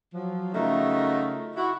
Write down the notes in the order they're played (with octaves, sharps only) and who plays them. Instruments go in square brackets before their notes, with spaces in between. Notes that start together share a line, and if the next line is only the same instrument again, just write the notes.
[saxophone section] F3 F#3
C#3 F#3 A3 D#4 F4 A#4
E4 F#4